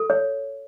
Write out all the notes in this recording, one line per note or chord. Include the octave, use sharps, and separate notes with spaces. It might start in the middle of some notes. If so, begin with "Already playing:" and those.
Already playing: A4
C#5